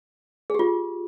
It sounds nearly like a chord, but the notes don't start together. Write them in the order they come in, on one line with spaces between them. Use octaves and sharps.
G#4 G4 F4